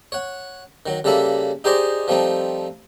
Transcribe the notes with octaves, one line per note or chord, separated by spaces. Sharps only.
C#5 F#5
D#3 F#3
C#3 G3 A#3 A4 E5 B5
D#4 G4 G#4 C5 D5 D#5
F3 G3 A3 C4 D#4